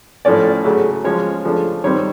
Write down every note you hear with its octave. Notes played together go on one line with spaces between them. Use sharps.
A2 F3 A3 C#4 D5
C#3 F#3 A3
F3 G#3 C#4 C#5
C#3 F3 A3 D4
D#3 G3 C4 C#5